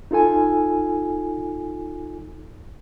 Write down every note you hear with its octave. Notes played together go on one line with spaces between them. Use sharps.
D#4 F4 A4 G#5